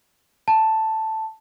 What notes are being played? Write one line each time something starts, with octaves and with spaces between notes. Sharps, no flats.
A5